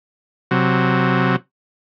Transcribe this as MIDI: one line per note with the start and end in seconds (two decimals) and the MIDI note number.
0.51 1.36 48
0.51 1.36 54